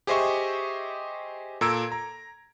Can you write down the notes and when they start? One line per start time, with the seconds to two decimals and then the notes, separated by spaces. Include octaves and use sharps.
0.07 G4 G#4 C5 D#5 E5 C#6
1.61 A#2 A4 A#5 E6 G#6 D7
1.92 A#5